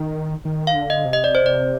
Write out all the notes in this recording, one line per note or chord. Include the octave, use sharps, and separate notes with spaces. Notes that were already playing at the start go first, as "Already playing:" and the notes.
Already playing: D#3
D#3
F5
D3
D#5
C3
D#5
D5
C5
D5